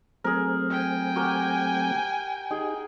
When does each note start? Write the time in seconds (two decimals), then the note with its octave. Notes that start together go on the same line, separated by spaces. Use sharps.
0.24 F#3 A3 C4 G#4 A#4
0.71 G5 G#5
1.16 F#4 G4 A#4
2.51 D#4 G4 G#4